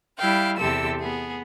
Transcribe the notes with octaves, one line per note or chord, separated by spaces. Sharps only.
G3 E4 F5 G5
E2 C3 G4 A4 E6
B3 G#4